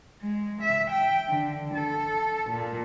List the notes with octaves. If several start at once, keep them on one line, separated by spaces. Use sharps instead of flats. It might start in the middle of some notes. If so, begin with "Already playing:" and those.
G#3
E5
G5
D3
A4
A#2